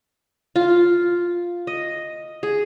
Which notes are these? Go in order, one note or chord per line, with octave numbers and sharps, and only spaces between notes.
F4
D#5
G#4